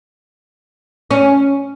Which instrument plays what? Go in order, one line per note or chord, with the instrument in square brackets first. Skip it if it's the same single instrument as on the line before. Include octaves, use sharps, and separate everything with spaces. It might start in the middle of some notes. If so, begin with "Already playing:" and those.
[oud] C#4